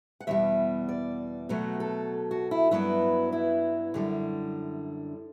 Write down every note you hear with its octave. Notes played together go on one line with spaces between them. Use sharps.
F#5
E2 B2 G3 E5
D5
B2 F#3 A3 F#4
A4
F#4
E4
G2 F#3 B3 E4
E4
F#2 D3 G3